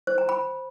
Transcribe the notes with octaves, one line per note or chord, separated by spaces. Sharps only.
C5
A#5
B5